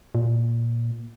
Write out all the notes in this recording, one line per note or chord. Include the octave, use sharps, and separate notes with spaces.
A#2